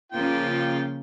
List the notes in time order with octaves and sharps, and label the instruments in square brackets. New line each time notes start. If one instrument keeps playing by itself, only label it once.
[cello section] C#3 F3 A#3 [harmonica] F4 G5